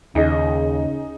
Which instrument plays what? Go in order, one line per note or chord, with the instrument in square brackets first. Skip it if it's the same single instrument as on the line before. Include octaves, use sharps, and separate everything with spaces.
[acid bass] D#2 [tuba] C#3 [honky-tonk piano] D#4 G#4 D#5